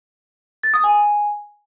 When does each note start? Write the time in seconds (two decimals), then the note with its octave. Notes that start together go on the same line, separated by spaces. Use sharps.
0.63 A6
0.74 D#6
0.84 G#5